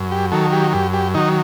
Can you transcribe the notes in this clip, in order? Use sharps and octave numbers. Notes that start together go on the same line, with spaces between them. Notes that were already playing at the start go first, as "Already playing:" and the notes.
Already playing: F#2
G4
D#3 F#3 A4
G4
F#2 G4
G4
D#3 F#3 D#4